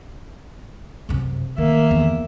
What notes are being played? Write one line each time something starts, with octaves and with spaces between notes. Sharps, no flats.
F#2 C3
D#3 A3 A#3 E5
E2